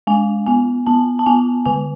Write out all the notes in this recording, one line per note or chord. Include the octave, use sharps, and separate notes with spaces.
G#3 G#5
B3 G#5
B3 A5
A5
B3 G#5
D3 G#5